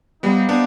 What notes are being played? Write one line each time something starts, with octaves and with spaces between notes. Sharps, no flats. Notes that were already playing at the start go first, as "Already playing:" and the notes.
G3 B3 D#4 G4 C5 F5
B3 D4